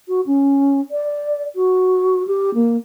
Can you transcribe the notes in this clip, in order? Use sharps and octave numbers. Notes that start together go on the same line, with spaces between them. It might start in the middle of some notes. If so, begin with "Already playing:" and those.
F#4
C#4
D5
F#4
G4
A#3